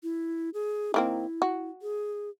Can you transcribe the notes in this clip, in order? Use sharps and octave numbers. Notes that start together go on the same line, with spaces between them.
E4
G#4
D#3 A#3 C4 E4
F#4
G#4